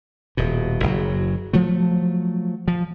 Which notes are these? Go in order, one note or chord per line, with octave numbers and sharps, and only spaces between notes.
D#1 B2
F#1 F#3
F3 F#3 A3
F3